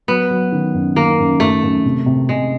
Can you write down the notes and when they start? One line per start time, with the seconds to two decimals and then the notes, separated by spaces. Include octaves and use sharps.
0.08 F#3 B3
0.31 F#3
0.52 D#3
0.74 F#2
0.96 D#3 A#3
1.19 F#2
1.40 F#2 A3
1.63 F#2
1.85 C3
2.06 C3
2.29 C3 G#3